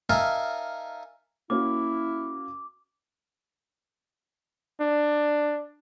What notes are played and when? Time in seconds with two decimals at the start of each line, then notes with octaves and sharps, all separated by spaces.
0.10 D#4 A#4 E5 F5 G#5 A5
1.50 A#3 C#4 E4 F#4 D6
4.80 D4